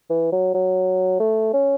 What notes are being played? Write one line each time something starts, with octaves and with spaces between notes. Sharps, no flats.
E3
F#3
F#3
A3
C#4